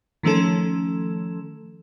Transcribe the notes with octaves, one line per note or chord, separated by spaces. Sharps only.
D#3 F3 A3 C#4 A4